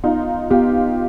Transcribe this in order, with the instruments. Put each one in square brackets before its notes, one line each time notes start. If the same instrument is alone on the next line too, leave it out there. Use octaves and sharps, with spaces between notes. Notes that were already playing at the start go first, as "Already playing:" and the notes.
[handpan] B3 [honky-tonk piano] D#4 F4
[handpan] B3 [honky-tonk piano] F4 G4